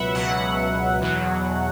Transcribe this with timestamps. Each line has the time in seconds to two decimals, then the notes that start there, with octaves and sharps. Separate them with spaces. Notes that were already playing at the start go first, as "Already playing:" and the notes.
Already playing: C#2 B2 F#3 B4 E5 F#5
0.15 C#2 B2 F#3 F#5
1.02 E2 B2 F#3